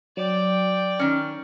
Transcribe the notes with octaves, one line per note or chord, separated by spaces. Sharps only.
F#3 D5 G5
D#3 C#4